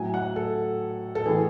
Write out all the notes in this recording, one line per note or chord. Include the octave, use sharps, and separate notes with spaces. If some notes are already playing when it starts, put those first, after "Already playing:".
Already playing: A2 F#3 G#5
F#5
A4
A4
A2 E3 G#4